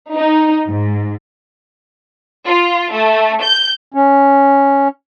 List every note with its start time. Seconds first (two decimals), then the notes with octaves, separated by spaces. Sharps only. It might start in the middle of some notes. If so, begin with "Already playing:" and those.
0.14 D#4
0.66 G#2
2.47 F4
2.91 A3
3.42 G6
3.94 C#4